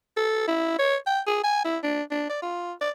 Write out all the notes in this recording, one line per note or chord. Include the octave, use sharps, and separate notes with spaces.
A4
E4
C#5
G5
G#4
G#5
E4
D4
D4
D5
F4
D5